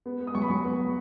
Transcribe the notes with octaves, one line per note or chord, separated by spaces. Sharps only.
B3
B3
D#6
F#3 C#6
B5
F#3 C#6
B3